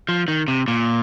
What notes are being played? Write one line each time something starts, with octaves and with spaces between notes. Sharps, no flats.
F3
D#3
C3
A#2